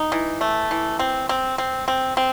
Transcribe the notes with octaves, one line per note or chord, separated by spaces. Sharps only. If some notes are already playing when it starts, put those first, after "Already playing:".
Already playing: D#4
E3
A3
E3
C4
C4
C4
C4
C4